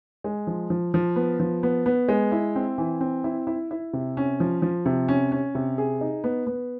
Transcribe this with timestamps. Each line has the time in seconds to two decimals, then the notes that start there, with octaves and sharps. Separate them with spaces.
0.24 G#3
0.47 F3
0.70 F3
0.94 F3
1.16 B3
1.40 F3
1.63 B3
1.86 B3
2.08 G#3
2.32 E4
2.56 C4
2.78 E3
3.01 C4
3.24 E4
3.47 E4
3.71 E4
3.93 C3
4.17 C#4
4.40 F3
4.62 F3
4.86 C3
5.08 C#4
5.32 C#4
5.55 C3
5.78 G#4
6.01 D#4
6.24 B3
6.47 B3